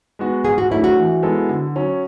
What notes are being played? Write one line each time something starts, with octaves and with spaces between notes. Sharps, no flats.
G#3 B3 F#4
G#2 G#4
F#4
F#3 A3 D4 E4
F#4
E3
G#3 B3 E4 A4
D3
F#3 C#4